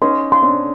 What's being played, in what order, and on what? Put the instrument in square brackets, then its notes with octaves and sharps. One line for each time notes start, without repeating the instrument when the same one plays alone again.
[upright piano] C#4 D#4 [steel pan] C6
[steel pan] C6
[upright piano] C4 D4